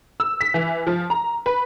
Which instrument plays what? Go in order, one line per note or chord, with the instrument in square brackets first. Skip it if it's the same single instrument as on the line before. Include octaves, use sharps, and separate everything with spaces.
[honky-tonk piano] E6
B6
E3
F3
A#5
B4